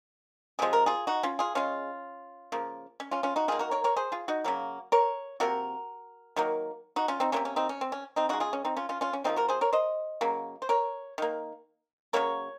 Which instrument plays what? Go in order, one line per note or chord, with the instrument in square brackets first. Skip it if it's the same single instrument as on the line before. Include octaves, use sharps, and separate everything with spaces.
[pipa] C3 F3 G#3 G#4
A#4
F4 G#4
D#4 F#4
C#4 F4
F4 G#4
C#3 G#3 C#4 F4
C#3 F3 A#3
C#4
C#4 F4
C#4 F4
D#4 F#4
D#3 A#3 F4 G#4
F#4 A#4
A#4 C#5
A#4 C#5
G#4 C5
F4 G#4
D#4 F#4
C#3 F#3 A#3
A#4 C#5
C3 F3 A#3 F#4 A#4
D#3 F#3 A#3
D#4 F#4
C#4 F4
C4 D#4
C3 F#3 A#3 C#4
C#4
C4 D#4
C#4
C4
C#4
C4 D#4
C#3 G#3 D#4 F#4
F4 G#4
C#4
C4 D#4
C#4 F4
C#4 F4
C#4 F4
C#4
C3 F3 A#3 C4 D#4
F#4 A#4
G#4 C5
A#4 C#5
C5 D#5
C#3 F#3 A#3
C5
A#4 C#5
D#3 A#3
C#3 F#3 A#3 A#4 C#5